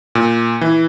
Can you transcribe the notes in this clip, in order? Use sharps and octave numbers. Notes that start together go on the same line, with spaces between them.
A#2
E3